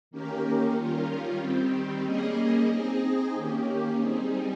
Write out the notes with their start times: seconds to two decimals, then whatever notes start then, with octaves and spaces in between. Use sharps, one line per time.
0.11 D#3 A#3 C#4 G4 A#4
0.76 D#3 G3 C#4 F4 A#4
1.40 D#3 G3 C4 G4
2.05 G3 A#3 C#4 G#4 D#5
2.69 C4 D#4 G#4 D#5
3.35 D#3 A#3 C#4 G4
3.99 G3 C4 D#4 G#4